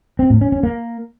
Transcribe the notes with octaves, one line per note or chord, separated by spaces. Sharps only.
C4
A2
C#4
C#4
A#3